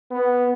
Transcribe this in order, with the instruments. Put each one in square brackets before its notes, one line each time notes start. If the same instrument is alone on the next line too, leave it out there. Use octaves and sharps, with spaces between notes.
[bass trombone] B3